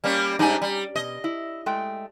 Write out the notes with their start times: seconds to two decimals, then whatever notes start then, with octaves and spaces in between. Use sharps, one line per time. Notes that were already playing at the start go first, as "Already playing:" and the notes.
0.04 G3 A#3 C#4
0.39 G#2 G3 D4 D#4 G#5
0.62 G3
0.96 B2 D#5
1.24 E4
1.66 G#3 A3 G5